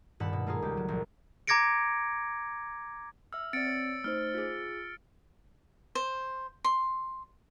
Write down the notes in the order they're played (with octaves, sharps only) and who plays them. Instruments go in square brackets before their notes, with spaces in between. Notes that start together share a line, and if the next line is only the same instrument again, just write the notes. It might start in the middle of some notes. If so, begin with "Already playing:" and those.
[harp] D#1 G2 F#5 A5 B5
B2
A3 A#3 F4 G#4
C#2 G4
F#3
A#1
[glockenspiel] A#5 D6 G#6 A#6 C#7 D7
[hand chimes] E5 F6 [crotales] E6
[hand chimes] C4 D5 [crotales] A6 C#7 D7
[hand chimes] C#5
[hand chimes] A3 D#4 C5 [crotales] F6
[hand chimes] F4 G#4
[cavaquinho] C5
C6